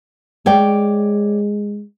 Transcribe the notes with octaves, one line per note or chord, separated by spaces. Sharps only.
G#3 C#5 D5 G5